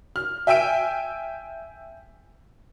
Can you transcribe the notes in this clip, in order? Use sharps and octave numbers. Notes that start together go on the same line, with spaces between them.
F6
E5 G5 G#5 E6 D7